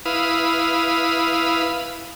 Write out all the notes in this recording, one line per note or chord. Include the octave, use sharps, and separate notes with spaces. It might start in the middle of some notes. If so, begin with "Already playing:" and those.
E4 B4 F5 D#6